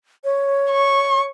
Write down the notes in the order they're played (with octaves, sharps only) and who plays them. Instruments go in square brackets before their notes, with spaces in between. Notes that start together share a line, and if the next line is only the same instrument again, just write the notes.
[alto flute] C#5
[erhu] C#6